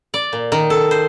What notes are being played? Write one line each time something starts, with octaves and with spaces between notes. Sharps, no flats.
D5
A#2
D#3
A4
C5